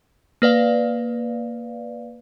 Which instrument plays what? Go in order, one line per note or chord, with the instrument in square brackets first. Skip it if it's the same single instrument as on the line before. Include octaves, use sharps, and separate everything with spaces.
[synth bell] A#3 B4 D5 F5